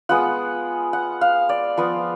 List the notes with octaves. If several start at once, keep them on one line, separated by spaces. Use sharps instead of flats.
G#3 B3 F4 F#5
F#5
F5
D5
F3 B3 F4